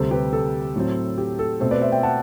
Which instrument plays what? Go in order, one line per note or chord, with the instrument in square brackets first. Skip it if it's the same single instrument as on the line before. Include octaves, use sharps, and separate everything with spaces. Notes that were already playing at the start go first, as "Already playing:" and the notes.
Already playing: [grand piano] D2 C3 G3 A4 C5
G4 B4
A4
A2 F#3 C4
G4
A4
B2 A3 C4 A4 C5
B4 D5
C5 E5
E5 G5
F#5 A5